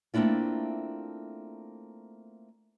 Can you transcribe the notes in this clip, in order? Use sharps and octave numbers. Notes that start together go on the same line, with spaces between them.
A3 A#3 C4 D4 E4 F4